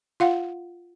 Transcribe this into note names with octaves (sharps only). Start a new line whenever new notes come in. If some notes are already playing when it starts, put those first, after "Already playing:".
F4 F5 F#5